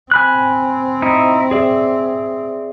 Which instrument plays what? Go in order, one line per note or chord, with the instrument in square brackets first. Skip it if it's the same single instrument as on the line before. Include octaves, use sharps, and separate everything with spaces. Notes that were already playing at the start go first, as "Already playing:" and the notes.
[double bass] C4 [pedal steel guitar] G#5 B5 F#6
[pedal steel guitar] D#4 E4
G#4 D5 E5